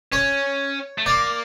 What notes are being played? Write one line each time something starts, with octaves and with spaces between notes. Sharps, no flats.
C#4 C#5
A3
A#3 D5